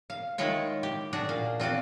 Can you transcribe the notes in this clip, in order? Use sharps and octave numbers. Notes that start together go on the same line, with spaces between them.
F5
D#3 G#3 E4 F4 C#5
G4
D4 F#4 G#4
A#2 F5
C4 F4 F#4 D5